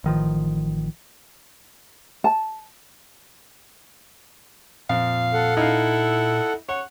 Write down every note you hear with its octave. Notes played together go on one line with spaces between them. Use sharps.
A1 D#3 F3
A5
F2 A#2 F5
A4 F#5
D#4 E4 F5
C#5 F#5